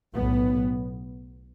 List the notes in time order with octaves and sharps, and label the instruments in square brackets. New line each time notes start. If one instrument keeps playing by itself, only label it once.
[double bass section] B1 A2 B3